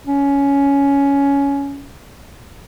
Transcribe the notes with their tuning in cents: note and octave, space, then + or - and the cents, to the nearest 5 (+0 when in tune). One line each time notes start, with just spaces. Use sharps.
C#4 +15